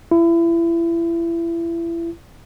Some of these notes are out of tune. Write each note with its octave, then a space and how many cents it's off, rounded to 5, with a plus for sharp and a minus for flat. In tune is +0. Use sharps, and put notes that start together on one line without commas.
E4 +30